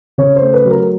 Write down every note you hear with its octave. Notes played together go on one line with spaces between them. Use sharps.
C#3 C#5
C5
A3
B4
F#3
A#4